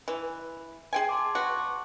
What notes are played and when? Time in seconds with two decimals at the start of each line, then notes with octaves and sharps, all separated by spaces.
0.08 E3
0.93 G#4 G5 G#5
1.09 A5 C6 D6
1.35 B2 F#4